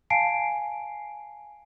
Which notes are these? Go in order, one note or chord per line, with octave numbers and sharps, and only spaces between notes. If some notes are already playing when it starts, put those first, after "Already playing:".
F5 G#5 A5 C7 D7